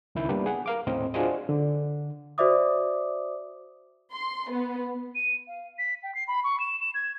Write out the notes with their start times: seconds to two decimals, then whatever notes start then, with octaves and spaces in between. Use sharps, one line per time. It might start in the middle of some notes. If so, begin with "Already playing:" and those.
0.15 C#2 D#3 E4 G6
0.29 G3 A#3 B3 D4 G4 B4
0.46 G#4 F#5
0.66 A#4 F5 D6
0.87 D#2 A2 C4 D#5
1.14 D4 F4 F#4 G#4 C5 D#5
1.49 D3
2.38 F#4 C5 D5 E5 D6 D#6
4.12 C6
4.49 B3
5.15 D#7
5.47 F5
5.78 B6
6.03 G5
6.15 C7
6.28 B5
6.44 C#6
6.60 E7
6.80 E7
6.94 G#6